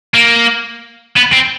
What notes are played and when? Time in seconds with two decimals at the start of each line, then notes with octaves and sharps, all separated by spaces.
0.14 A#3
1.17 B3
1.33 C4